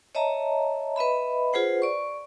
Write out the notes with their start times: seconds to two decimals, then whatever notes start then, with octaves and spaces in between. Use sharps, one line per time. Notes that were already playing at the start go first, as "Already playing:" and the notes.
0.15 C#5 D#5 E5 A5 A#5
0.96 B4 D#5 E5 B5
1.53 F4 G#4 B4 C5 F#5
1.82 D5 C#6